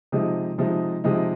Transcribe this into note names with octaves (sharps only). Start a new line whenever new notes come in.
C3 F3 G#3 D#4
C3 F3 G#3 D#4
C3 F3 G#3 D#4